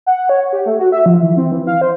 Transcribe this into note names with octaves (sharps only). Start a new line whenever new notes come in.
F#5
C#5
G4
A3
F#4
E5
F3
E3
C4
E3
F5
C5